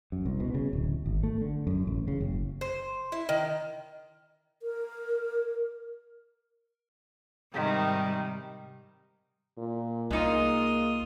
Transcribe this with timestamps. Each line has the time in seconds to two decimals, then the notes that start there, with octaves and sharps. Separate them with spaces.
0.12 F#2
0.26 C2
0.40 B2
0.54 C#3
0.73 D1
1.06 G#1
1.23 A3
1.41 D3
1.67 F#2
1.87 A1
2.08 C#3
2.20 F#1
2.61 C5
3.12 E4
3.29 D#3
4.63 A#4
7.54 G#2 C3 D#3 G3
9.58 A#2
10.11 C2 G#3 A#3 D#4 F4 D#6